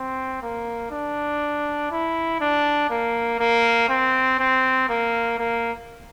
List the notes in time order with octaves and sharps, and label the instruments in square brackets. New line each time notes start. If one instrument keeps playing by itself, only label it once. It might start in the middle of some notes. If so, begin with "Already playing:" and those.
Already playing: [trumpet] C4
A#3
D4
E4
D4
A#3
A#3
C4
C4
A#3
A#3